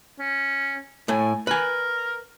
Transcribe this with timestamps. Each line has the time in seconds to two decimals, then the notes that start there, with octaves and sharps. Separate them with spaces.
0.19 C#4
1.08 A2 A3 G#5
1.47 A#4 B4 G#5